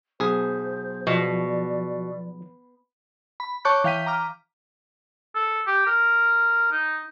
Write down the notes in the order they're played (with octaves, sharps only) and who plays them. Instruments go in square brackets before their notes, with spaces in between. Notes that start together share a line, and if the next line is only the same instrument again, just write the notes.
[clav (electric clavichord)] B1 G#4 [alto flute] C5
[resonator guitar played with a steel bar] B2 [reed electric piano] F3 [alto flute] D5
[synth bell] B5
C#5 A5 C#6 D6 F#6 G6
E3 F5 G5 G6 B6 D#7
A#5 D6 F6
[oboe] A4
G4
A#4
D#4